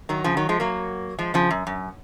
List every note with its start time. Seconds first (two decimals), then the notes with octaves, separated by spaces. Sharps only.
0.09 D#3 F#3
0.24 C#3 F3
0.37 D#3 F#3
0.49 F3 G#3
0.60 F#3 A#3
1.18 F3 G#3
1.34 C#3 F3
1.51 F#2
1.67 F#2